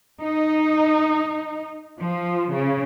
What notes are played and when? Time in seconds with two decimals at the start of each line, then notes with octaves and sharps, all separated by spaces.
0.23 D#4
1.99 F3
2.53 C#3